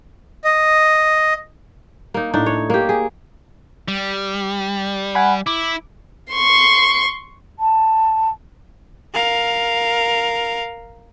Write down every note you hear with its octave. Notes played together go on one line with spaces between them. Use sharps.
D#5
A#3 D#4
A2 D4 D#4
C#5
A#3 G4
G#4
G3
F#5 G#5 B5
E4 D6
C6 C#6
A5
A#4 F5